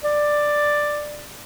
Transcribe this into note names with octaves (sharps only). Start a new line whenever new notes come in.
D5